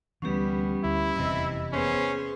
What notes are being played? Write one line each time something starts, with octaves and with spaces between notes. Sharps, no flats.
D2 E3 G3 B3 C#4 G4
D2 E4
F1 E2 C3 D#5 E6
B3 C#4 G#4 C5